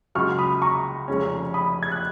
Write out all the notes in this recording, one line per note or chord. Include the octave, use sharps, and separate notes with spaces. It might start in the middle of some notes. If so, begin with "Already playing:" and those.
C#2 C#3 F#3 C#6 F6
B5 D#6
A#5 C#6
F1 F2 C#3 G#3 C#4
B5 D#6
G#6
F#6